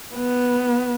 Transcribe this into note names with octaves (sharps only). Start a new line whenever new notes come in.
B3